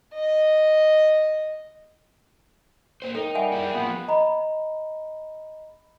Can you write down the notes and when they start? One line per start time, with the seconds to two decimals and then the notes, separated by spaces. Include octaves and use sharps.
0.15 D#5
3.02 A#3 C5
3.15 D#4 A4 A#4 G5
3.35 G3 E5 F#5 G#5
3.52 E4 G#4
3.74 F3 A#3 B3 F4
4.08 D#5 A#5 B5